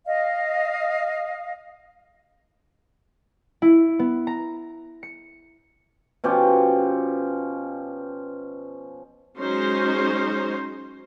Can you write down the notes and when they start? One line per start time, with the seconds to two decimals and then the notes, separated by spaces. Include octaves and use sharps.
0.05 D#5 F5
3.62 E4
3.99 B3
4.27 A#5
5.03 C#7
6.24 B2 F3 C#4 G4
9.39 F#3 G#3 C#4 D#4 C5